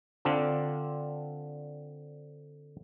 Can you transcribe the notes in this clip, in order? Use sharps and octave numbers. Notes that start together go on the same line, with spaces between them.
D3 C4 D4 F4